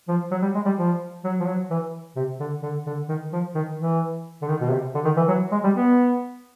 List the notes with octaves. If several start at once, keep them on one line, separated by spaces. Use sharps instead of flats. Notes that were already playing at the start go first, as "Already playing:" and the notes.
F3
F#3
G3
G#3
G3
F3
F#3
F3
F#3
E3
C3
D3
D3
D3
D#3
F3
D#3
E3
D3
D#3
B2
C3
D3
D#3
E3
F#3
G#3
G3
B3